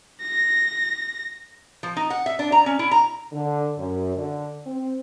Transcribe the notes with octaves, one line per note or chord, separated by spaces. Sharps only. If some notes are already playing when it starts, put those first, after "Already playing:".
A#6
F3
D#4
F#5
E5
D4
A#5
C#4
E4
A#5
D3
F#2
D3
C4